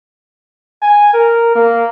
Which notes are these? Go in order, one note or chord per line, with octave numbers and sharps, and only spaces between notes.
G#5
A#4
A#3